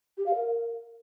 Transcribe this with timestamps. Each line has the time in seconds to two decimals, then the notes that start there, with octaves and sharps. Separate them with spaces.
0.17 G4
0.26 F5
0.35 A#4